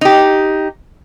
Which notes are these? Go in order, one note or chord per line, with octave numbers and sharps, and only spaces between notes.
D#4 G4